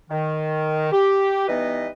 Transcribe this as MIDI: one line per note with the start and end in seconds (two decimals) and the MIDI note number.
0.10 0.90 51
0.92 1.48 67
1.48 1.88 52
1.48 1.88 55
1.48 1.88 59
1.48 1.88 63
1.48 1.88 71
1.48 1.88 75